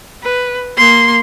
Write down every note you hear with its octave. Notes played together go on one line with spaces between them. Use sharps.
B4
A#3 C6